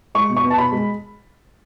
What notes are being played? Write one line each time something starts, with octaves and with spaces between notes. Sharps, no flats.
G#3 C#6
B2
C#6
B3
A5
B2 B5
G#3